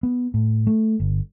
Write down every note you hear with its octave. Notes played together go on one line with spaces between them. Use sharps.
B3
A2
A3
G1